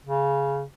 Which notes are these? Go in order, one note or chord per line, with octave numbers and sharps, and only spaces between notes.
C#3